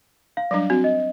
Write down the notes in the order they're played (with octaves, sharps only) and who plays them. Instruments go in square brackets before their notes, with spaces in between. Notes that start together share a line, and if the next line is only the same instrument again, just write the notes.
[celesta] F5
[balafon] F#3 G3 D4
[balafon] C4 [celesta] F#4
[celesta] D#5